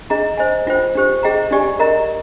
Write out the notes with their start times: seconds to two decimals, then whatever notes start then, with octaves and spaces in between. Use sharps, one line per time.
0.10 D4 G#4 D#5 A#5
0.37 C5 D#5 G#5
0.67 D4 F4 C5 G5
0.95 D4 G4 C5
1.23 G#4 D#5 G5 A#5
1.51 D4 G4 D5 G#5
1.79 A#4 D#5 A#5